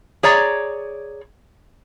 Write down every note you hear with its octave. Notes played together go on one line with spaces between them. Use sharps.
G#4 C#5 D5 A#5